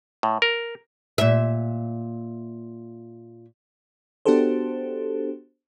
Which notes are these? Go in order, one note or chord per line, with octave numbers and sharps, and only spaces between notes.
A2
A#4
A#2 E5
B3 D4 F#4 G4 A4 C5